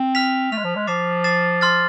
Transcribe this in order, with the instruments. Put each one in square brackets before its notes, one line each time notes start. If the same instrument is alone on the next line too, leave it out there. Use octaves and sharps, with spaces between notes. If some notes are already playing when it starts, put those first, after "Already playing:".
Already playing: [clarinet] C4
[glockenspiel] F6 B6 F7
[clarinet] A3 [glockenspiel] F6 B6 F7
[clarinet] G#3
F3
G#3
[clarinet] F3 [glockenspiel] D6 A6 C7 E7
[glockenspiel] D6 A6 C7 E7
C6 F6 A6